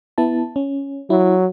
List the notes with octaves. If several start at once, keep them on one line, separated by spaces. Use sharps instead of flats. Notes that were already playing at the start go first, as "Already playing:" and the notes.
B3 E4 A5
C#4
F#3 E4